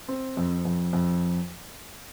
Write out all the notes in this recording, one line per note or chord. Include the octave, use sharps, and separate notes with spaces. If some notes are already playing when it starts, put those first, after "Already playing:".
C4
F2
F2
F2